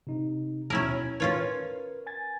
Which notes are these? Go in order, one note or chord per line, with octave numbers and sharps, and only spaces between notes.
C3 D#4
D#2 B2 C#4 E4 A#4
C#4 F4 A#4 B4 C#5
G#5 G#6 A6